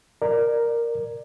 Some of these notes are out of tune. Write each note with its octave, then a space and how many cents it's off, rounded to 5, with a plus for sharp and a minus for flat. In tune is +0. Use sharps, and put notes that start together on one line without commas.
A#4 +0 D5 +20